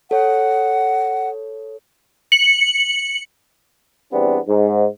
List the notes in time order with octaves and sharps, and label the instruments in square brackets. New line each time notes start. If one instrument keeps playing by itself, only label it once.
[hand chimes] A4 C#5 [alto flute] F#5
[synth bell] C#7 F#7
[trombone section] E2 G3 B3 C4 D4
G#2